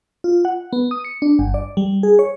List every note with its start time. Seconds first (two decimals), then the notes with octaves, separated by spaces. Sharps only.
0.24 F4
0.45 F#5
0.73 B3
0.91 D#6
1.04 C#7
1.22 D4
1.39 G1
1.54 D5
1.77 G3
2.03 G#4
2.19 C#5